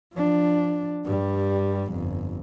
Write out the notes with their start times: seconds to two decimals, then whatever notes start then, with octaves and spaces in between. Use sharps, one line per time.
0.14 F3 D4
1.05 G2 G3
1.91 G1 F2